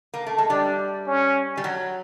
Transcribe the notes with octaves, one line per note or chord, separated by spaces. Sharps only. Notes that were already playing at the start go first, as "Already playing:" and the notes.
A#3
A3
G#3
G3 D4
C#4
G3
F#3